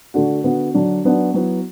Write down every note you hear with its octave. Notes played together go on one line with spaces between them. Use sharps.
D3 A3 D4 F#4
D3 B3 F#4
D3 F#3 D4
F#3 B3 D4 F#4
F#3 B3 E4